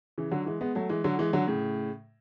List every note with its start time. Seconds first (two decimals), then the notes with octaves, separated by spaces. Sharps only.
0.18 C#3 E3
0.31 D3 F#3
0.46 E3 G#3
0.61 G#3 B3
0.75 F#3 A3
0.89 E3 G#3
1.04 D3 F#3
1.19 E3 G#3
1.33 D3 F#3
1.47 A2 C#3